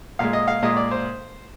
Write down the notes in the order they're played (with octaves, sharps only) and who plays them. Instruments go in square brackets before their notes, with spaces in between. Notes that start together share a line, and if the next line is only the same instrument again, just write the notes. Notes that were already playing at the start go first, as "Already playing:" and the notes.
[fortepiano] A#2 G#3 F5
D#5
F5
A#2 G#3 D#5
D5
C5